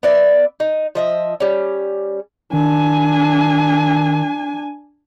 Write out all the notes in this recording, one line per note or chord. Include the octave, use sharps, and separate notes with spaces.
B3 D5 E5
D#4
F3 D#5 E5
G3 C#4
D#3 D4 G#5